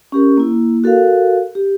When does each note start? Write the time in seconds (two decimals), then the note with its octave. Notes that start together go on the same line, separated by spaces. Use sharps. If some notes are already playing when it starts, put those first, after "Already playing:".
0.12 C#4 G4 A#4
0.37 A#3 E4
0.84 F#4 A4 A#4 F5
1.55 G4